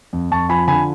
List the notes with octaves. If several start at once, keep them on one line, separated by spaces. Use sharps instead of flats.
F2
F2 A5 C#6
F3 G#5 B5
D3 G#5 B5